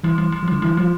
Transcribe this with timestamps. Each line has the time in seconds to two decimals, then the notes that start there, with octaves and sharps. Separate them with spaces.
0.04 E3 G3
0.18 E3 G3
0.32 G3
0.43 F3
0.48 D3 G3
0.62 E3 G3
0.77 F3 G3